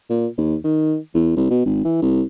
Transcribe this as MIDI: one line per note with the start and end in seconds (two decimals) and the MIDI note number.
0.10 0.27 46
0.38 0.56 39
0.64 0.97 51
1.14 1.31 40
1.36 1.49 36
1.50 1.64 47
1.65 1.80 32
1.85 2.00 52
2.02 2.23 36